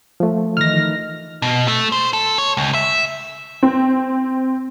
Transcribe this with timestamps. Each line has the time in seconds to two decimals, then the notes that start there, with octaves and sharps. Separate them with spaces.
0.20 F3 A3
0.57 D#3 E3 F6 A#6
1.42 B2
1.68 A3
1.92 C5
2.13 A4
2.38 C#5
2.57 C#2
2.74 E5
3.63 C4